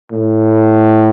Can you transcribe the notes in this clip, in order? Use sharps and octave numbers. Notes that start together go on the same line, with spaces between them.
A2